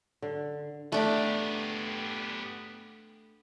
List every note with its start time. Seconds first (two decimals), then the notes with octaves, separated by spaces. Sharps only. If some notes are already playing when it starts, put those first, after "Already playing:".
0.22 D3
0.92 A3 B3 D4 G4